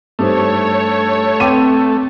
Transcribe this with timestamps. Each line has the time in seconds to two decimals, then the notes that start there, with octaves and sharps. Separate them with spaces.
0.19 G2 A3 D4 D#4 C5 C#5
1.40 C4 B4 G5 D6 D#7